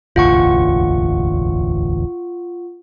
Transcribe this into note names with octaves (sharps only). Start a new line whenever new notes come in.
E1 A1 D2 F4 F#5 C#6